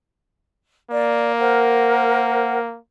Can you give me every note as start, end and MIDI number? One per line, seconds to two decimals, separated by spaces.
0.90 2.78 58
0.90 1.31 74
1.39 2.58 70
1.39 2.58 72
1.39 2.58 78